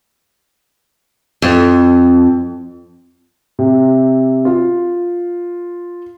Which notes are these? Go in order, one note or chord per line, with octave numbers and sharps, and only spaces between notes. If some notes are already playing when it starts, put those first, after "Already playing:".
F2
C3
F4